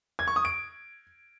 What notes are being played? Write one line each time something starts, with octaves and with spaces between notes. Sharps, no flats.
G#6
C#6
D#6
D7